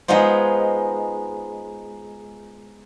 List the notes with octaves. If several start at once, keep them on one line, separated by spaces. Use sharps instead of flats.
G#3 B3 D#4 F4 C5